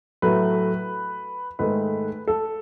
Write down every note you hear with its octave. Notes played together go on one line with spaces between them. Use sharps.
A2 F#3 A3 B4
G#2 D#3 A3 B4
A4